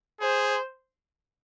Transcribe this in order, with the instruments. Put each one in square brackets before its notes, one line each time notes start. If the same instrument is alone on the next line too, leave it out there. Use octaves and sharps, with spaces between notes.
[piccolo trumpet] G#4 [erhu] C5